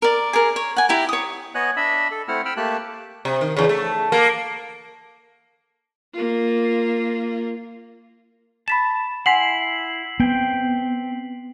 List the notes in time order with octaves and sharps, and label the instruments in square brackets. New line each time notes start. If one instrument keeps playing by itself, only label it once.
[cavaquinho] A#4 D5
G#4 A#4
C#5
F#5 G#5
E4 G4 A#5
C#5 D#6
[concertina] B3 C#5 D#5 G#5 F#6
D4 D#5 E5 B5 E6
A4
A3 C4 E4 F#5 F6
G5 B5 E6 F6
A3 A#3 G4 A5 F#6
[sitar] C3
D#3
E2 C#3
A3
A#3
[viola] A#3 F4
[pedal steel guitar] A5 [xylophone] B5 B6 E7
[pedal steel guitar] E4 [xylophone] F#5 G#5 C6 [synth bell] B6 C7 F#7
[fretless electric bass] B3 [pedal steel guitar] C4 G5